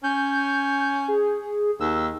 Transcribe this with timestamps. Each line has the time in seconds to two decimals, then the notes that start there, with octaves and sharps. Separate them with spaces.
0.04 C#4 G6
1.08 G#4
1.80 D#2 E6